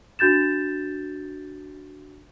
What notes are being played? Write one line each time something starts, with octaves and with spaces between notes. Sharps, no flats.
D4 F#4 G6 A6 E7